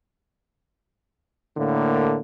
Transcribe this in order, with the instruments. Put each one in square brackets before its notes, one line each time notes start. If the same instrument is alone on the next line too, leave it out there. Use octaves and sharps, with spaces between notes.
[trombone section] A2 D3 A#3